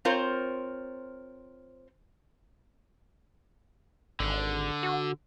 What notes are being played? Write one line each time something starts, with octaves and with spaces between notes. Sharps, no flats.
C4 F4 A#4 C5 C#5
G#1 D3
F#4